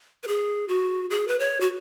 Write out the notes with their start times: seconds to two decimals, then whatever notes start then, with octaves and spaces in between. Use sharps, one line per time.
0.23 B4
0.28 G#4
0.68 F#4
1.10 G#4
1.28 B4
1.39 C#5
1.61 F#4